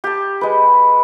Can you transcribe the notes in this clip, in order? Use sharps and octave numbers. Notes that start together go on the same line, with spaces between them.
G4 A5
G#3 B4